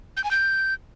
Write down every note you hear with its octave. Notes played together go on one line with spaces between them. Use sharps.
G6
G#5
G6